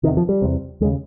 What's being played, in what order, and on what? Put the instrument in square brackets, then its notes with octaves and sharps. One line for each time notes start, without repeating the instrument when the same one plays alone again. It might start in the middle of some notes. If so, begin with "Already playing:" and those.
[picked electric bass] C3 D#3
E2
F3
G3
E2 C3
D#2 G#3
C#3